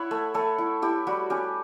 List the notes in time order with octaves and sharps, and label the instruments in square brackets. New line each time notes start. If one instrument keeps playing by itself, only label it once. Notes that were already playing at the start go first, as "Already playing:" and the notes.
Already playing: [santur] E4 C#5 F#5
A3
A3 A4 C#5
E4
E4 G4
G3 F#4
C#4 G4